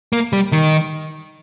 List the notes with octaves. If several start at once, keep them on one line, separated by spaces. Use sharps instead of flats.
A#3
G3
D#3